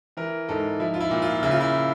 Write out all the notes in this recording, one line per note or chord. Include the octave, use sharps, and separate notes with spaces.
E3 A#4
G#2 A4
F3 E4
F4
E4
A#2
F4
C#3 E4
F4
E4